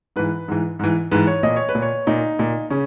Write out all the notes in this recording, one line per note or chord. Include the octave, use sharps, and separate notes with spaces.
G#2 E3 B4
G#2 E3
G#2 E3
G#2 E3 B4
C#5
A#2 D#5
C#5
B4
A#2
C#5
A#2 D#4
A#2
C#3 C#4